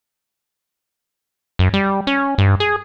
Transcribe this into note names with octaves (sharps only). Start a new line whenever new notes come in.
F#2
G3
C#4
G2
G#4